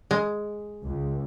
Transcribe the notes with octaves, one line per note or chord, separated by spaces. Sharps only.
G#3
C#2